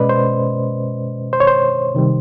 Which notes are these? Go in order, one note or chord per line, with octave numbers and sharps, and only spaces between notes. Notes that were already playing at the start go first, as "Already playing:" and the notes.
Already playing: B2 G#3 C#4 B4 D5 D#5
C5
C5
C#5
C5
C3 D#3 G3